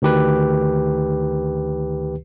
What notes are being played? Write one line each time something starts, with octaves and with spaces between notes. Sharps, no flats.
D2 D#3 G4 B4